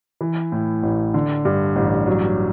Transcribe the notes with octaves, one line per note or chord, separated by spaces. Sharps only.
E3
A2
A1
D3
G2
A1
F#3